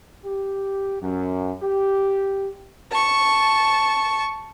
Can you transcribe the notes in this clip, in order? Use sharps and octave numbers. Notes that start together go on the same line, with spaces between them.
G4
F#2
G4
A5 C#6